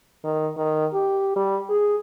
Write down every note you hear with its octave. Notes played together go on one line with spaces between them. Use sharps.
D#3
D#3
G4
G3
G#4